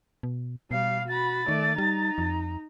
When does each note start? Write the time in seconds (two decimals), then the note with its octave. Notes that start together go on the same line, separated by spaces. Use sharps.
0.23 B2
0.71 B2 G3 F5 C7
1.08 F#4 B5 A6
1.48 D#3 A3 D5
1.78 G3 D#4 A#5
2.18 F2